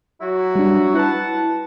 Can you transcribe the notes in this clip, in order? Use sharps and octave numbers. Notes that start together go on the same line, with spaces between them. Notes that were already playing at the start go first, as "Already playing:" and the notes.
F#3 E4 F#4
G3 D4
E4 B4 F#5 A5